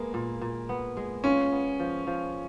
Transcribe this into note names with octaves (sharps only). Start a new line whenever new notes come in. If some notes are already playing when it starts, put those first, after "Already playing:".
Already playing: G#3 A#3 B3
A#2
A#2
B3
G#3
C#4 F4
B3
F3
F3